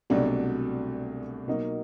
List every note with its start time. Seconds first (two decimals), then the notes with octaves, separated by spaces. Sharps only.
0.10 C2 B2 F#3 A3 D4
1.47 B2 F#3 A#3 D#4